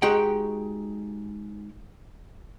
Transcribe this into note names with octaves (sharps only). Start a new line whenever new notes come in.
G#3 D#4 F#4 G4 G5